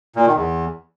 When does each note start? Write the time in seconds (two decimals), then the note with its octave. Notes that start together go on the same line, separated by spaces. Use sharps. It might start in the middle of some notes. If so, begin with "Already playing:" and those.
0.16 A#2
0.26 D#3
0.36 E2